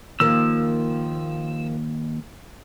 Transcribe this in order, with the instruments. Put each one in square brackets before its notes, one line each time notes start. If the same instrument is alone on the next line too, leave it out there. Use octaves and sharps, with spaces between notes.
[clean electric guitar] D#2 [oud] D#3 F3 A#3 [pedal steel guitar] E6